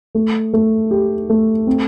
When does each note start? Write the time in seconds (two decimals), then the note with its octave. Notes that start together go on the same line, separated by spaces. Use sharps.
0.15 A3
0.53 A3
0.91 G4
1.30 A3
1.67 C4